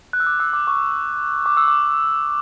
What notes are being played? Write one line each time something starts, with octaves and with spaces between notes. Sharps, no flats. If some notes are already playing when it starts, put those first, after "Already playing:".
F#6
E6
D6
E6
D6
C#6
D6
E6
D6